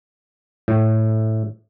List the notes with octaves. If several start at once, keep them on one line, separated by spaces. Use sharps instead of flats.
A2